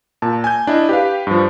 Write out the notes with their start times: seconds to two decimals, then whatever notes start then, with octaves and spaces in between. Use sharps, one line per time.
0.22 A#2 A5
0.44 G#5 G6
0.67 D4 E4 D#5
0.89 G4 B4 F5
1.27 G2 F3